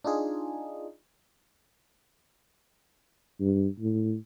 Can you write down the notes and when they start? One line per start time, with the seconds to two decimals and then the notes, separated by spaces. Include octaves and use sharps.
0.04 D4 D#4 F4 G#4
3.40 G2
3.80 A2